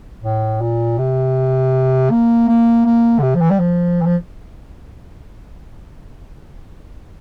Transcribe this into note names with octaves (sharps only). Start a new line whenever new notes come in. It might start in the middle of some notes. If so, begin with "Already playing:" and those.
A2
A#2
C3
A#3
A#3
A#3
D3
C3
F3
E3
G3
F3
E3
F3